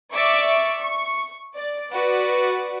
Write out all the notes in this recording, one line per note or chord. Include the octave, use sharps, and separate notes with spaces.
D5 E5 C#6 D6 D7
C#6
D5
F#4 B4 D5